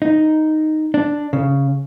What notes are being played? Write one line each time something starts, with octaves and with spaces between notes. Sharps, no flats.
D#4
D4
C#3